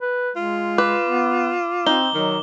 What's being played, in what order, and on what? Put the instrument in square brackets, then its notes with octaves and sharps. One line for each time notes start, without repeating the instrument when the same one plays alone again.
[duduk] B4
[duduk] G#3 [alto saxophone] F4
[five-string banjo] B4 [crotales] D6
[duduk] B3
[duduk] C4 [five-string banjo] D#4 [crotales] G7
[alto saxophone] D#3 [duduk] F#3